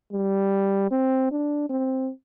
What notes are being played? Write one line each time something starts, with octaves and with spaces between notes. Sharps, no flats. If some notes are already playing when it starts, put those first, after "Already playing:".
G3
C4
D4
C4